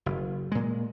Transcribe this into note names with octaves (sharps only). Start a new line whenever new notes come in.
F#1
A#2 G#3